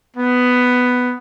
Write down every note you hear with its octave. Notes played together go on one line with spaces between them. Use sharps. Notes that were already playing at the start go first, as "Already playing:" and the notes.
B3